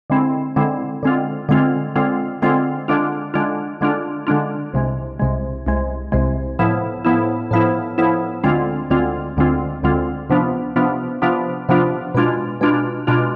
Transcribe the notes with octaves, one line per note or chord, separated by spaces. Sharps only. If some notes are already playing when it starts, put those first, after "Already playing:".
D3 G#3 C4 E4
D3 G#3 C4 E4
D3 G#3 C4 F4
D3 G#3 C4 F4
D3 G#3 C4 F4
D3 G#3 C4 F4
D3 G#3 D4 F4
D3 G#3 D4 F4
D3 G#3 D4 F4
D3 G#3 D4 F4
C2 C3 G#3
C2 C3 G#3
C2 C3 G#3
C2 C3 G#3
A2 F3 B3 E4
A2 F3 B3 E4
A2 F3 B3 E4
A2 F3 B3 E4
D2 D3 G#3 C4 F4
D2 D3 G#3 C4 F4
D2 D3 G#3 C4 F4
D2 D3 G#3 C4 F4
C3 F3 B3 D4 F4
C3 F3 B3 D4 F4
C3 F3 B3 D4 F4
C3 F3 B3 D4 F4
B2 G#3 D4 F4
B2 G#3 D4 F4
B2 G#3 D4 F4